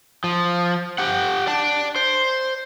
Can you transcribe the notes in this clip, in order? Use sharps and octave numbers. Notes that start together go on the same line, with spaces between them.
F3
G4 F#5
D5 A5
C5